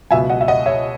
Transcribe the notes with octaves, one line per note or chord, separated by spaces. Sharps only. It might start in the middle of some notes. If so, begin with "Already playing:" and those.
C#2 B2 F#3 E5 G#5
D#5 F#5
E5
D#5 F#5
C#5 E5